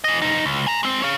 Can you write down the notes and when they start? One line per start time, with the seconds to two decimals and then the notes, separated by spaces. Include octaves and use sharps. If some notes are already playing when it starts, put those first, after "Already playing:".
0.04 E3 D#5
0.21 F2 D#4
0.46 C#2
0.67 G#5 A#5
0.83 G#3 C4
1.02 C#5 F5